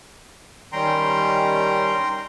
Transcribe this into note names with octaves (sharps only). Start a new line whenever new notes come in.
D#3 G3 C#4 G5 A#5 C6